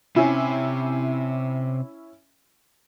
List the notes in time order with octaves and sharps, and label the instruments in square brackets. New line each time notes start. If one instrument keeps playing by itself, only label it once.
[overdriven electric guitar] C3 [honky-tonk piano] C#4 E4